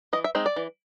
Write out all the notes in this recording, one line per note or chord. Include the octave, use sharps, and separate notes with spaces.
E3 D#5
E5
G#3 C4 D#4
D5
E3